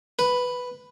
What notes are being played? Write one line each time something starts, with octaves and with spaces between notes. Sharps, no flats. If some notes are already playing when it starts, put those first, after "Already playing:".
B4